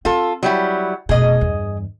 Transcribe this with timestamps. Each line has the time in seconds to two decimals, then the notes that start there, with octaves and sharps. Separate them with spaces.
0.05 C4 F4 A4
0.43 F#3 G3 E4
1.09 F1 B2 G#4 D#5
1.41 E2 G2